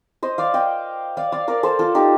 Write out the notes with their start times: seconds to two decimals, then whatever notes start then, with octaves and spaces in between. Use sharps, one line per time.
0.23 C5 D#5
0.38 D5 F5
0.54 D#5 G5
1.17 D5 F5
1.32 D5 F5
1.48 A#4 D5
1.63 A4 C5
1.79 F4 A4
1.95 D#4 G4